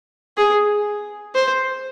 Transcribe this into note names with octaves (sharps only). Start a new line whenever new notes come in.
G#4
C5